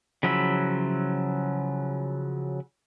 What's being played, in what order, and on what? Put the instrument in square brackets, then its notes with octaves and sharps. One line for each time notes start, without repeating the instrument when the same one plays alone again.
[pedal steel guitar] C#3 F3 F#3 E4 E5